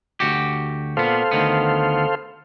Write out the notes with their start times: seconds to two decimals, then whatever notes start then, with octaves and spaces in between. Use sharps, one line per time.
0.20 D2 F#4 G4
0.97 A#2 B3 A4 C5 F5
1.31 D2 D#3 B3